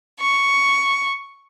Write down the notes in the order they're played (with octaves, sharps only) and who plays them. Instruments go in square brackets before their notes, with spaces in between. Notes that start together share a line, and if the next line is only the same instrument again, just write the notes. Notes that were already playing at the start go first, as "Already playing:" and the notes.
[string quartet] C#6